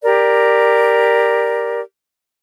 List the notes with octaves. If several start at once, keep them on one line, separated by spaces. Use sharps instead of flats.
G4 A#4 D5